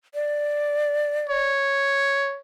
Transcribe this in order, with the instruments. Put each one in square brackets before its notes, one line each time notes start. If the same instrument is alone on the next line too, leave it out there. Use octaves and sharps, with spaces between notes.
[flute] D5
[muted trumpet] C#5